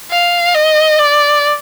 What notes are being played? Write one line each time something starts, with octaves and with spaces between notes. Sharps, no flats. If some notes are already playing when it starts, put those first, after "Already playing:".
F5
D#5
D5